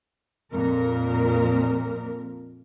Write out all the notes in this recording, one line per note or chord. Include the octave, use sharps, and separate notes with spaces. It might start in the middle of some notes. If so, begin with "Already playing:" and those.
F2 A#2 A#4